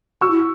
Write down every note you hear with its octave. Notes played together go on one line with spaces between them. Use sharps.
F#4 C#6 E6
E4